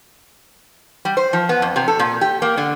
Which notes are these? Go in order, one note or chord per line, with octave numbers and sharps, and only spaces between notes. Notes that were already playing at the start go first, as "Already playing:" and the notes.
G3
C5
F3
B3
F2
C3
A4
A#2
G4
A#3
D3